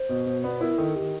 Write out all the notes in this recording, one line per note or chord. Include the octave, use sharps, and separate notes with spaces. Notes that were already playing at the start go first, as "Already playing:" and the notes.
Already playing: C5
B2
B2
B3 D5
E4 A#4
D#3 A4
D#3 G4